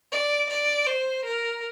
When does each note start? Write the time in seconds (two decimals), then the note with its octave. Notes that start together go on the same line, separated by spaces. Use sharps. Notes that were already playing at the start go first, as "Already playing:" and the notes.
0.12 D5
0.50 D5
0.87 C5
1.24 A#4